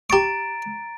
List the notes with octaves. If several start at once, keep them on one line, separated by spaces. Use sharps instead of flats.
G4 A#5 C#6 A6 D7